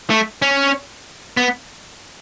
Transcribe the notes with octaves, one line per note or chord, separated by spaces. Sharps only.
A3
C#4
B3